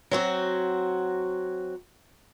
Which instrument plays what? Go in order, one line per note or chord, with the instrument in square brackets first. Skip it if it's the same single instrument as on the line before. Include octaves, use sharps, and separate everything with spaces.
[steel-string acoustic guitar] F#3 C4 F#4